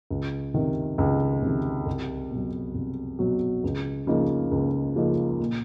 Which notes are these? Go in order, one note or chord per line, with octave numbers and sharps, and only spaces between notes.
C#2
C3 D#3
C#2
C3 D#3
C2
B2 F#3
C2
B2 F#3
C#2
C#3 F3 A#3 D#4
C#2
C#3 F3 A#3 D#4
A#2